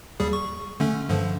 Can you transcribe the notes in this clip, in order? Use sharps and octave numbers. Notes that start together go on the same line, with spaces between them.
D#2 G3 G#4
C#6
D3 A3 C#4
G2 D3 F3